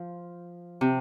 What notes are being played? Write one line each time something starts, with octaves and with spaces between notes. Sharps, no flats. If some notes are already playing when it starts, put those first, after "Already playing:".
Already playing: F3
C3